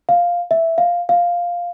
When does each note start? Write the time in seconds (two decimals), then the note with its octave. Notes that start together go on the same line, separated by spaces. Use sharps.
0.09 F5
0.51 E5
0.78 F5
1.09 F5